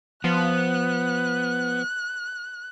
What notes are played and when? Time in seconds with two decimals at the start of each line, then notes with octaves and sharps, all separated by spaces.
0.24 F3 B3 F#6